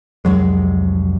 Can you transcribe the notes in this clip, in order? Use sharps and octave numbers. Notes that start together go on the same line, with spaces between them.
C2 F2 F#3 G#3